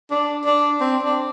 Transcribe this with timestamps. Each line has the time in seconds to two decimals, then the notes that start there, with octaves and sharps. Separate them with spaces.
0.11 D4
0.45 D4
0.80 C4
1.03 D4